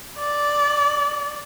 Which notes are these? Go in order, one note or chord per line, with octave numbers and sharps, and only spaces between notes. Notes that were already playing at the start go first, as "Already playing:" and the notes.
D5